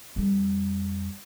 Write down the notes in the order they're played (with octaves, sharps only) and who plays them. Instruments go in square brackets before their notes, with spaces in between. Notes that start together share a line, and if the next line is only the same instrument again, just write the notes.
[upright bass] F2 G3